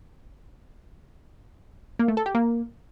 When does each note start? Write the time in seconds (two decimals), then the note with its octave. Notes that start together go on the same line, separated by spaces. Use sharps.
1.99 A#3
2.08 A3
2.17 A4
2.26 G4
2.35 A#3